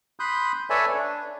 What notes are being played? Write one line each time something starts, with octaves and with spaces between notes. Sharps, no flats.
B5 C6 D#6 F#6 G6
A4 B4 C#5 D5 E5 G#5
D4